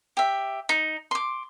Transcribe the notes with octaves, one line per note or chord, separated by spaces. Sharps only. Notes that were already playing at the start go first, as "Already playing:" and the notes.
G4 E5
D#4
C6 D6